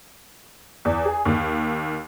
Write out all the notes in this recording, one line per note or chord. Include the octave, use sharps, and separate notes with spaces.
E2
G#4
D#2